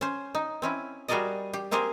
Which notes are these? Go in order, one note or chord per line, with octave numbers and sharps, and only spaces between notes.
C#4 C5
D#4
C4 C#4 E4
G3 F#4 G#4 A#4 D5 D#5
G4
A#3 C4 G4 G#4 A#4 C5